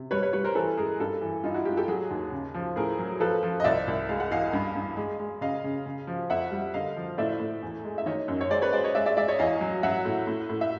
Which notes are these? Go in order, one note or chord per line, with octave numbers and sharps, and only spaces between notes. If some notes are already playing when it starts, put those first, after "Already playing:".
Already playing: C3
G3 B4 C#5
B4 C#5
G3 B4 C#5
A#4 C5
E3 A4 B4
G#3 G#4 A#4
G2 G4 A4
E3
G2 D#4 F4
E4 F#4
G#3 F4 G4
G4 A4
F#3 F#4 G#4
D#2
C#3
F3
A2 G#4 A#4
F#3
F3 A4 B4
F3
D#5
C2 D5 E5
C2
G#3 F5
F#5
E2 D#5 F5
G2
G2
G#3
G#3
C#3 D#5 F5
C#3
C#3
F3
F2 E5 F#5
G3
D3 D#5 F5
F3
A2 D5 E5
A2
E2
G#3
E5
D#3 C#5 D#5
F#2
C#5
G#3 C5 D5
B4 C#5
G#3 C5 D5
C#5 D#5
G#3 D5 E5
D5 E5
G#3 D5 E5
C#5 D#5
E2 D#5 F5
F#3
F#3 E5 F#5
A2
A2
A2
E5